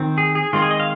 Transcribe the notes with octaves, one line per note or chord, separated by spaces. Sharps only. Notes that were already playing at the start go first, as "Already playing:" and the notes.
Already playing: D#3 C4
G#4
G#4
D#3 G#3 C4 F4
G#4
D#5
F5